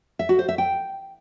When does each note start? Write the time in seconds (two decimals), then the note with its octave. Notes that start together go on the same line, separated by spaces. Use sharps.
0.19 E5
0.29 F#4
0.39 C5
0.49 E5
0.58 G5